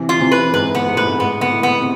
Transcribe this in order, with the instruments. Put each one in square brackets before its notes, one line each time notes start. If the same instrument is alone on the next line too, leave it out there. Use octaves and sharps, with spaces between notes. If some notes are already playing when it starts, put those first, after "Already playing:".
Already playing: [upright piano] C3 E3
[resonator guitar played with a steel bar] F4
[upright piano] C3 E3
[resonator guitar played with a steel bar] B4
[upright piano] G#2 [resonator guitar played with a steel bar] B4
[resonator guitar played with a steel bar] B3
[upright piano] G#2
[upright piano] A2 [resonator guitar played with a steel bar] B4
[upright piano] G#2
[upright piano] G#2 [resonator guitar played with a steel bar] B3
[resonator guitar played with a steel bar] B3
[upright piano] A2
[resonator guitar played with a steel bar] B3
[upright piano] C3